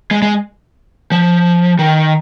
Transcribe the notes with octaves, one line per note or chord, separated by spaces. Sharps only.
G#3
G#3
F3
D#3